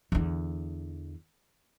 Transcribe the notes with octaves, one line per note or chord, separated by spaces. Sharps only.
E2 D3